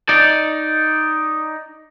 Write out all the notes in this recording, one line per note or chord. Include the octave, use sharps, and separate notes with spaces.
D#4 D5